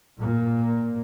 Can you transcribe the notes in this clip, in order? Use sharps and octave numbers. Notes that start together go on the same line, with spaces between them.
A#2